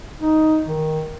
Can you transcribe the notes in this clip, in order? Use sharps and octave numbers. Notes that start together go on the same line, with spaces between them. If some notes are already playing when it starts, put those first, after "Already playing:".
D#4
D#3